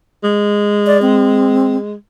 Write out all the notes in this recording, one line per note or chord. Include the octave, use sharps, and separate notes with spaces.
G#3
D5
C4